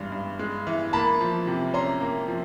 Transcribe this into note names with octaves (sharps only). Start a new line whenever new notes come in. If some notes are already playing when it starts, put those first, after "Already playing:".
Already playing: G2 E3 G#3
G2
G#3
E3
A#3 A5 B5
F3
C3
C#4 A#5 C6
A#3
F3